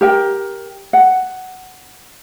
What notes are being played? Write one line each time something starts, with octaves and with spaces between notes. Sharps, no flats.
G4 A#4 G5
F#5